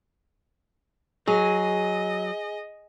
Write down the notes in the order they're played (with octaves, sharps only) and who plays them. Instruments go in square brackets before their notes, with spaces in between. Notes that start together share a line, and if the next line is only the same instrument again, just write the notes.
[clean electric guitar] F#3 [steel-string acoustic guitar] G#4 [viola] D#5